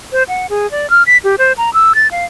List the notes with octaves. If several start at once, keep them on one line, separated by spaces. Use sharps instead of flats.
C5
F#5
G#4
D5
F6
B6
G4
C5
A#5
E6
A6
F5